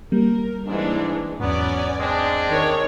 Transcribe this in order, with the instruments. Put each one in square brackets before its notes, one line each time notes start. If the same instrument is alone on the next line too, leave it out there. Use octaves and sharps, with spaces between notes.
[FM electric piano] G3 A#3 [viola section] A#4
[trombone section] G#2 [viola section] E3 G#3 D4
[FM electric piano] E2 G#2 [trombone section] F#3 B3 [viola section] C#4 D5
[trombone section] G#3 C4 D4
[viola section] D#3 C#5